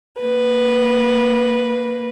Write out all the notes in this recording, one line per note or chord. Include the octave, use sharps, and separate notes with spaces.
A#3 B4